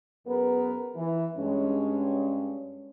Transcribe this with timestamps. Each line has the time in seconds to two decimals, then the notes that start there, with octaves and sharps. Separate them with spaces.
0.27 F#2 B3 G#4 A#4 B4
0.95 E3
1.37 G2 G#3 C#4